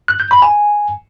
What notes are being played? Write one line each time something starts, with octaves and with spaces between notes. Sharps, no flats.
F#6
G6
B5
G#5